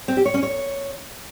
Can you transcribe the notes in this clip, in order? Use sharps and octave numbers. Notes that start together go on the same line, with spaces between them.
C4
G4
C#5
C#4
C#5